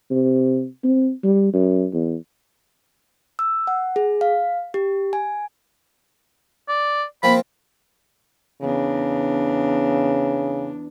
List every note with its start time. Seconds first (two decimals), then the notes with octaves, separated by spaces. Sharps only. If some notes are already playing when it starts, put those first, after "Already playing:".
0.11 C3
0.84 C4
1.24 G3
1.53 F#2
1.93 E2
3.39 E6
3.67 F#5
3.96 G#4
4.21 F5
4.74 G4
5.13 G#5
6.69 D5
7.23 F3 A#3 C4 B5
8.62 E2 C#3 D4